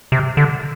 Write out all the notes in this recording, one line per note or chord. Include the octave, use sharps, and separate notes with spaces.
C3
D3